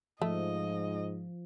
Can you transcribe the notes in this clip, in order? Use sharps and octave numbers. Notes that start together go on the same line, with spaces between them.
G#2 F3 A3 D#5